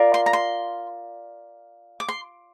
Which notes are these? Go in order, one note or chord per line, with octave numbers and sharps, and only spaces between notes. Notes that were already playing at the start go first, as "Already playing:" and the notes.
Already playing: F4 A#4 D5
C6
A#5
C6
D6
C6